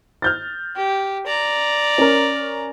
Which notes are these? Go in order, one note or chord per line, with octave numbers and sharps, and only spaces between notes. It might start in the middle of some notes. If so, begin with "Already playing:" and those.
F6 G6 A6
G4
D5 A#5
C#4 A#4